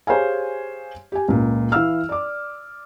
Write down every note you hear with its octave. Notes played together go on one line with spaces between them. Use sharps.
G4 G#4 C5 C#5 F5 G#5
G4 G#5
C#2 A#2
E3 E4 F5 E6 F6
D5 D6